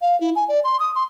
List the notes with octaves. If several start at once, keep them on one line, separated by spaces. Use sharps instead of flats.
F5
E4
G#5
D5
C6
D#6
C6